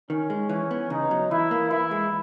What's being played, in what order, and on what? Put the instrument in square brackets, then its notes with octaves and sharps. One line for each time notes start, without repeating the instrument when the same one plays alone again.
[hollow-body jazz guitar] D#3 [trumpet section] C#4
[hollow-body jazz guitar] G#3
[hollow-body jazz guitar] E3 [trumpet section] C#4
[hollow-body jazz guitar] B3
[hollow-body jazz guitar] C#3 [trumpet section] D#4
[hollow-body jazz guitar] F#3
[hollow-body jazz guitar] E3 [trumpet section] E4
[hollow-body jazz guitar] A#3
[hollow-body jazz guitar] E3 [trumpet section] E4
[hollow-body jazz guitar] G#3